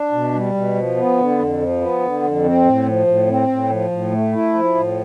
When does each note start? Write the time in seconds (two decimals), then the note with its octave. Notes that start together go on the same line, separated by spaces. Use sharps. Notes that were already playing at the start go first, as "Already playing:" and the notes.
Already playing: D4
0.13 B2
0.33 G3
0.54 B2
0.75 F3
0.97 B3
1.18 D3
1.39 F2
1.60 F3
1.81 B3
2.01 D3
2.23 F2
2.44 C4
2.65 A2
2.86 F3
3.07 A2
3.27 C4
3.48 A2
3.69 F3
3.90 A2
4.12 A3
4.33 E4
4.54 F3
4.75 A2